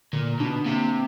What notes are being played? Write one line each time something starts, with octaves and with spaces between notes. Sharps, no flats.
A#2 D3
B2 D4
C3 A#3